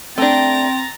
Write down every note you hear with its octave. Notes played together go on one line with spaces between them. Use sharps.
A3 C4 D4 G5 A#5 A6